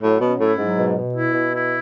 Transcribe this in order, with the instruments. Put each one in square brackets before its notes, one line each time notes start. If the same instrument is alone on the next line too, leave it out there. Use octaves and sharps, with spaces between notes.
[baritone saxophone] A2 [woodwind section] F#3
[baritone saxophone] B2 [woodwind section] C#4
[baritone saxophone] A2 [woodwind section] E4
[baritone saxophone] G#2 [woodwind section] F#3
[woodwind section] B2
B2
E4
B2
E4